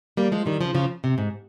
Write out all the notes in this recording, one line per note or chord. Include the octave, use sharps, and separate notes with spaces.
G3 A#3
F3 G#3
D#3 G3
C#3 F3
C#3 F3
C3
G#2